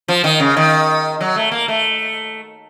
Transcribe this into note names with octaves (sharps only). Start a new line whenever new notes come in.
F3
D#3
C#3
D#3
F#3
A3
A#3
A3